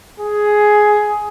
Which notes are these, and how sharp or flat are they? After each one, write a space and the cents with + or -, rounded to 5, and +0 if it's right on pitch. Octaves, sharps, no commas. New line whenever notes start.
G#4 +10